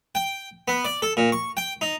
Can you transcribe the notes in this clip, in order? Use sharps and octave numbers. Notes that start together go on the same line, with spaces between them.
G5
B3
D5
A4
A#2
C#6
G5
D#4